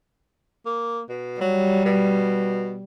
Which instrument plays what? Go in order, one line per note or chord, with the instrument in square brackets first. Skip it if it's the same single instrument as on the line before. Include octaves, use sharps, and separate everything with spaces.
[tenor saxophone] A#3
B2
[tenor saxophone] F#3 [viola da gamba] G3
[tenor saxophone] B2